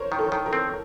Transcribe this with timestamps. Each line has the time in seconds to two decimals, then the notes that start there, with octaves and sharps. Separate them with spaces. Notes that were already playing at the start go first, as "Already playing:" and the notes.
Already playing: A#4 C5 C#5
0.12 D#3
0.19 A4
0.32 D#3
0.46 A#4
0.53 C4